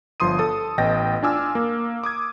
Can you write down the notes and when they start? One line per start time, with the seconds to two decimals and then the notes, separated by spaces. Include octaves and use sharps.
0.20 G1 F3 C6 D#6 D#7
0.39 A4 A5 D#6
0.78 A1 B3 D#5 G5 A6 A#6
1.23 D4 F4 G#5 D6 E6 F6
1.55 A#3
2.04 D6 D#6 G#6